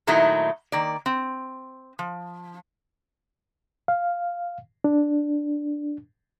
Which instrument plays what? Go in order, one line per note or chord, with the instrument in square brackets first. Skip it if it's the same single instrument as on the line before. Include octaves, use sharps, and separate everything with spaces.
[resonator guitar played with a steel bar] A#2 D#3 F#3 A3 D#4 E4
D#3 A#3 D5
C4
F3
[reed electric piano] F5
D4